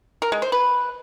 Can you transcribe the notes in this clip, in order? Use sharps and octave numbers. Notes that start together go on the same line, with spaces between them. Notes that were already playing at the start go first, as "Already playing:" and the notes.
A#4
G#3
C5
B4